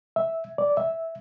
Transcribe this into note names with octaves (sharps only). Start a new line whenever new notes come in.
E5
D5
E5